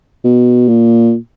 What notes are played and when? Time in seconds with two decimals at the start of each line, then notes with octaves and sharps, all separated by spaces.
0.24 B2
0.68 A#2